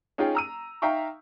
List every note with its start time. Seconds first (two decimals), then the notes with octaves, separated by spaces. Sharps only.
0.18 C#4 D#4 F4 G#4 G5
0.35 A#5 E6 D#7
0.82 D#4 E5 F5 G5 A#5 C#6